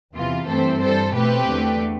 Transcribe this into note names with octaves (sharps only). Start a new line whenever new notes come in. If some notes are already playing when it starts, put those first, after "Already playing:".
E2 C3 E3 F4
G2 E3 A3 C4 A4 C5
G2 E3 G3 A4 C5
B2 A3 C4 G4 B4
E2 D3 A3